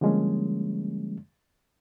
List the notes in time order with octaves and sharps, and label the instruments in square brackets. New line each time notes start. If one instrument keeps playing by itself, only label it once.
[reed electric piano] D3 F3 G3 G#3 A#3 C#4